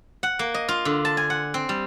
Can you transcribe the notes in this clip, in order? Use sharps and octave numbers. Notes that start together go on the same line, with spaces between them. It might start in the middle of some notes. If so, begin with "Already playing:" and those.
F#5
A#3
D#5
F4
D3
A5
G#5
F#5
C4
G3